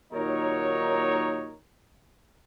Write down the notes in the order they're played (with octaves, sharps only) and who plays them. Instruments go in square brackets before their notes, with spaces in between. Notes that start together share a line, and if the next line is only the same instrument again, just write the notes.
[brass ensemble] D#2 A#2 F#3 D#4 A#4 C#5